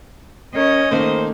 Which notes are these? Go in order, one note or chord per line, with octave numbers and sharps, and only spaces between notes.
C#4 A#4 C#5 D#5
D#3 A3 A#3 C5